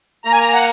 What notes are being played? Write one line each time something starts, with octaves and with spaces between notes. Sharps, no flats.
A#3 A#5
G#5
A#5
F#5